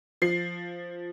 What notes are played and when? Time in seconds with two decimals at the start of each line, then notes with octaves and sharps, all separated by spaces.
0.22 F3 C7